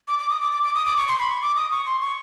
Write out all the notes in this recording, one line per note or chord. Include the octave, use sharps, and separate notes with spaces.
D6
D6
D#6
D6
D6
D6
D#6
D6
C#6
C6
B5
C#6
D6
D#6
C#6
C6
C#6